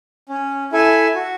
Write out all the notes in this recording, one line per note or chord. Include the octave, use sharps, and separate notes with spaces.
C#4
E4 A4 E5 G#5
F#4